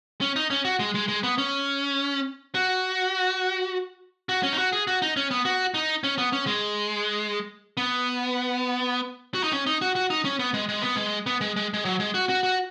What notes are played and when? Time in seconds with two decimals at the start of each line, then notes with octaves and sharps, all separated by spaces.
0.21 C#4
0.36 D#4
0.50 C#4
0.65 F#4
0.80 G#3
0.95 G#3
1.08 G#3
1.23 B3
1.38 C#4
2.55 F#4
4.29 F#4
4.43 C#4
4.52 D#4
4.58 F#4
4.73 G#4
4.87 F#4
5.02 D#4
5.17 C#4
5.31 B3
5.45 F#4
5.74 D#4
6.04 C#4
6.18 B3
6.33 C#4
6.47 G#3
7.77 B3
9.34 F#4
9.43 D#4
9.53 C#4
9.67 D#4
9.81 F#4
9.95 F#4
10.10 D#4
10.25 C#4
10.39 B3
10.54 G#3
10.69 G#3
10.82 B3
10.96 G#3
11.26 B3
11.41 G#3
11.56 G#3
11.74 G#3
11.85 F#3
12.00 G#3
12.14 F#4
12.29 F#4
12.43 F#4